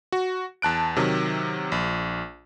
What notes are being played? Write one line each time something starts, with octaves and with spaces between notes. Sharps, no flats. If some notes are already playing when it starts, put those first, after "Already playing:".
F#4
E2 A5 F#6 D7
C3 D#3 F#3
A#1